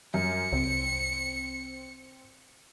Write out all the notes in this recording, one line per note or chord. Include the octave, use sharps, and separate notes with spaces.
F#2 C#7
C2 C4